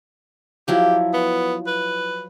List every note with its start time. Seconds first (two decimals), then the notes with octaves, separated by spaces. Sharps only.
0.68 F3 F#3 E4 G4
1.13 B3
1.67 B4